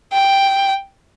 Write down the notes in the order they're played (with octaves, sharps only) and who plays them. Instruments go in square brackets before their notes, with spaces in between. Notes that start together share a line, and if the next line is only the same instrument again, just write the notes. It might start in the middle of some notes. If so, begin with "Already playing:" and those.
[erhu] G5